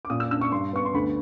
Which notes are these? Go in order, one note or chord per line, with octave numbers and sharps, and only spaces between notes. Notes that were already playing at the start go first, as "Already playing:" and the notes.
D6
A#2 D#6
E6
D4 E6
C#6
G2 C6
B3 C#6
C6
D2 B5